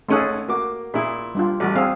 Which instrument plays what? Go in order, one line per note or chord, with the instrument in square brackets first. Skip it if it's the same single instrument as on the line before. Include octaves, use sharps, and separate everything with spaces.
[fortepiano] G#1 C#4 F#6 [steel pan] A3 G#4 A4
[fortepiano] A#3 D6 [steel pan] F#4
[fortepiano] A#2 E4 [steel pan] G#4
[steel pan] G3 D4 F4
[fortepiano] A1 [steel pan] G3 F#4 D5
[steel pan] C4 G#4 [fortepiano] F5 E6